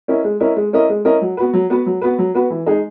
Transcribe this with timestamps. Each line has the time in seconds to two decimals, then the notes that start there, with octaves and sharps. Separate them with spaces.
0.08 C#4 E4 A#4 D#5
0.24 G#3
0.40 C#4 E4 A#4 D#5
0.56 G#3
0.73 C#4 E4 A#4 D#5
0.89 G#3
1.05 C#4 E4 A#4 D#5
1.21 F#3
1.37 B3 F#4 B4
1.53 F#3
1.70 B3 F#4 B4
1.86 F#3
2.02 B3 F#4 B4
2.18 F#3
2.35 B3 F#4 B4
2.50 E3
2.66 G#3 D#4 G#4